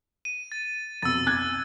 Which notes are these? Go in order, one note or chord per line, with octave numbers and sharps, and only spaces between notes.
D#7
A6
F2 B2 E6 A6
D6 F#6 G#6